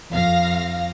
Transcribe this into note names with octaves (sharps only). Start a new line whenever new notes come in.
F2 F5 A#6